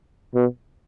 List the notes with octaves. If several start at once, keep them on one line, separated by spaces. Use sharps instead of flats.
B2